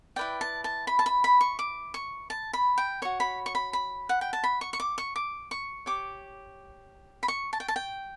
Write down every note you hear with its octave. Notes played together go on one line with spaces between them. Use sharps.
E4 B4 D5 G5
A5
A5
B5
A5
B5
B5
C#6
D6
C#6
A5
B5
G5
F#4 C#5 C#6
B5
C#6
B5
B5
F#5
G5
A5
B5
C#6
C#6
D6
C#6
D6
C#6
G4 C#5 D6
B5
C#6
A5
G5
A5
G5